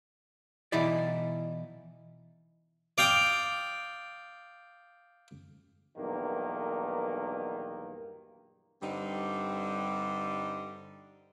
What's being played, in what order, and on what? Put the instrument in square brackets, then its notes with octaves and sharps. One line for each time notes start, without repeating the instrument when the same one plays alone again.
[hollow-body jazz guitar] B2 E3 D#4 E4 D5
[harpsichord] D5 F5 G5 D#6
[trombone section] B1 E2 G2 D#3 A#3
[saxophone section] G2 D3 G3 C4 D#4